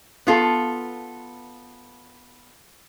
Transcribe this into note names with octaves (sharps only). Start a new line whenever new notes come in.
B3 F4 A4